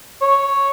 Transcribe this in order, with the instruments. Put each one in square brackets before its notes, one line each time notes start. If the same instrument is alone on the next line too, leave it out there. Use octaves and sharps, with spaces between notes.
[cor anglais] C#5